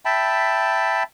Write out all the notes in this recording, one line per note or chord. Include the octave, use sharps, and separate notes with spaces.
E5 G5 A5 B5